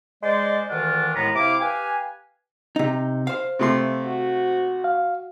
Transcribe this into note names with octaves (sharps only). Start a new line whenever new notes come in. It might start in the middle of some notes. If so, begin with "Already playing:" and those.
G#3 C5 D5
D2 D#3 E3 D4 F4 F#5
D#2 A2 G#3 B3 A#5
C3 E4 F5 D6
G4 B4 F5 G#5
C3 D#4
C5 F5
C3 A3 C6
F#4
F5